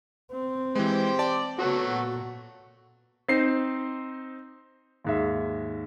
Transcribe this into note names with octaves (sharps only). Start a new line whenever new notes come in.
C4
E3 G#3 G4 C5
D5 A5
C#3 F#3 A3 B3 F#4
A#2
C4 D#4 C5 C7
D#2 G#2 E5